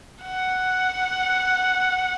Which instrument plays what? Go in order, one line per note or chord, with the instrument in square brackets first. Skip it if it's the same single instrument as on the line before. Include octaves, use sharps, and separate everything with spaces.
[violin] F#5